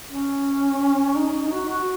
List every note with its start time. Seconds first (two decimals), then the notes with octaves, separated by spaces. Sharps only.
0.08 C#4
1.16 D#4
1.47 D#4
1.52 F#4
1.70 F#4